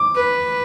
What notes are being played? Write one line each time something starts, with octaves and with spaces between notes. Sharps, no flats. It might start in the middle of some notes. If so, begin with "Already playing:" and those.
Already playing: D6
B4